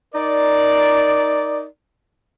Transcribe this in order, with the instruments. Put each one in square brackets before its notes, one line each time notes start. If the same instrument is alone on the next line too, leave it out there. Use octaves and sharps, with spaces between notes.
[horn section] D#4 A#4 D5